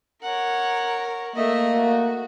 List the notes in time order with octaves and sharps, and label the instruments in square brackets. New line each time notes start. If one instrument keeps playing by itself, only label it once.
[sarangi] A#4 [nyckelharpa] C#5 F#5
[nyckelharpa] A3 D#5 [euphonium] A#3 [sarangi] E5
[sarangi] F#4